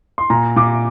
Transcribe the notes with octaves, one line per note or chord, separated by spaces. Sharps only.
C6
A#2 A#5
A#2 D6